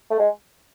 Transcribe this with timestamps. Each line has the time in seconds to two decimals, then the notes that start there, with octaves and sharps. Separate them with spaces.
0.10 A3
0.19 G#3